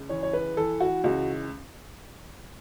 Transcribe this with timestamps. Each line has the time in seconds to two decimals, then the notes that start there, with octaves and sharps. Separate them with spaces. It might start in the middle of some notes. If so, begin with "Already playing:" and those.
Already playing: C#2
0.09 E3 C#5
0.23 C#5
0.33 B4
0.57 E3 A4
0.80 F#4
1.04 C#2 F#4